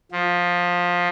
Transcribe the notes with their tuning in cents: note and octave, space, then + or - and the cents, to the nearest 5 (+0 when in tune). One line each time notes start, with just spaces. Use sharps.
F3 +15